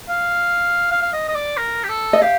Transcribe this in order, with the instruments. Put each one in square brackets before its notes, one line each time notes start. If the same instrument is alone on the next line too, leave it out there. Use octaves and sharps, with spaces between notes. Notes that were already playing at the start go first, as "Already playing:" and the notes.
[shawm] F5
F5
F5
D#5
D#5
D5
A#4
G4
A4
[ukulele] D#5
[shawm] G4 [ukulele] F5